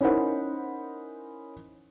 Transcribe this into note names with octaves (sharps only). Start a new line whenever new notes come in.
C#4 D#4 E4 A#4 C5 F#5